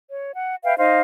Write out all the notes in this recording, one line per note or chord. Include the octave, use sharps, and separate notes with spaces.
C#5
F#5
B4 E5 F5 G5
D#4 C5 D#5 F5